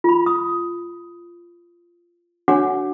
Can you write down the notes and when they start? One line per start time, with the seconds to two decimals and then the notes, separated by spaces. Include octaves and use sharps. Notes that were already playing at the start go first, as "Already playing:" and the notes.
0.04 F4 B5
0.26 D#6
2.48 D4 F#4 C#5 F#5 G#5 D6